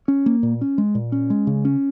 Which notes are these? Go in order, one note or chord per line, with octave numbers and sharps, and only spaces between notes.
C#4
A#3
A#2
C#4
G#3
A#2
C#4
G#3
C#3
C#4